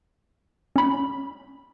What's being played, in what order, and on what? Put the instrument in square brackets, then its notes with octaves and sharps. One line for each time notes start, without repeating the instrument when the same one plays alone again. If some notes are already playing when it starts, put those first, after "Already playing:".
[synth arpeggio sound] C#4 B5